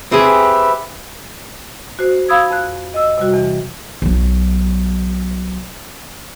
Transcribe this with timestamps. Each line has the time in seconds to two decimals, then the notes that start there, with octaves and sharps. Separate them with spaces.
0.12 C4 G4 G#4 B4 E5
1.99 F#4 C5
2.29 F5 B5 D#6 E6 G#6
2.51 F2 F#6
2.94 D#5 E6
3.18 C3 G3 F#4
3.34 E2 E3
4.02 B1 F#3